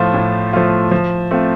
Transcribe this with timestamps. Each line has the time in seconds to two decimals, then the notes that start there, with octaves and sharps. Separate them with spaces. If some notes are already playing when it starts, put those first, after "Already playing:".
Already playing: A2 F3 A3 F4
0.14 A2
0.53 F3 A3 F4
0.91 F3
1.31 A3 C4 F4